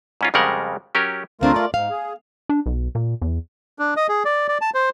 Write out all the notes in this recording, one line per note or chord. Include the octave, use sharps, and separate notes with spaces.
G#2 C#4 F4
F2 C#3 G3 G#3 A#4 F#5
F#3 C#4 G4 A#4
D2 A3 C4 D4 F4 A#4
D5
G#2 F5
G#4
D4
B1
A#2
E2
D4
D#5
G#4
D5
D5
A5
C5